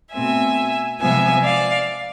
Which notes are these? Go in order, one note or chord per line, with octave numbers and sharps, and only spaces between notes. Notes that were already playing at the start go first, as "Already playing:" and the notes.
B2 A3 C4 E5 G#5
C3 F3 G#3 B3 E5 G#5
D5 F5